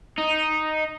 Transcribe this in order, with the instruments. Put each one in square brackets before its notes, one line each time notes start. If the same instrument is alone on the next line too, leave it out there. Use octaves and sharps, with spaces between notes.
[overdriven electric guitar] D#4